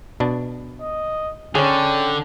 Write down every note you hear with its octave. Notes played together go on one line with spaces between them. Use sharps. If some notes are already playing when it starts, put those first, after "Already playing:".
B2 D4
D#5
D3 C#4 G#4 C#5 G5